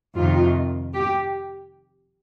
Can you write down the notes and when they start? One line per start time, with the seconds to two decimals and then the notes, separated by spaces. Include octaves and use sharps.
0.16 F2 C3 D#3 F4
0.94 G4